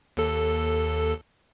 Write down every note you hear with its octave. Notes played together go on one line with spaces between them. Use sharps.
D#2 A4